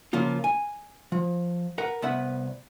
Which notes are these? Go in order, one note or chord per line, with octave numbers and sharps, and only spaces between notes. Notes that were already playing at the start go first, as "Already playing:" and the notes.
C#3 F3 A#3 F4
G#5
F3
A#4 B4 F#5
C2 B3 B4 E5 F#5